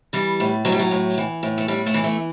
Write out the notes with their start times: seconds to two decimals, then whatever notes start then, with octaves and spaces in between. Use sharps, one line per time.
0.13 E3 G3
0.40 A2
0.65 A2 F#3
0.72 G3
0.79 F#3
0.91 A2
1.18 E3
1.43 A2
1.58 A3
1.68 A2 G3
1.86 A3
1.94 E3
2.04 A3